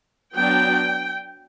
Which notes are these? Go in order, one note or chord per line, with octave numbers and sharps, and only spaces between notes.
F#3 B3 D4 G5